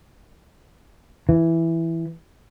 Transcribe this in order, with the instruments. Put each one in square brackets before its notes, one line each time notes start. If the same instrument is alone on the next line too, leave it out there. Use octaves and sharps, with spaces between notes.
[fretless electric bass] E3